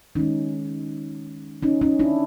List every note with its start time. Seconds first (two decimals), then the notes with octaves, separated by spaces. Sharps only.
0.15 D#3 G#3 C#4 D#4
1.63 C#4 D#4
1.81 C#4 D#4
1.99 D4 E4